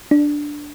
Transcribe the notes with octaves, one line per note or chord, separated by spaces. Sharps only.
D4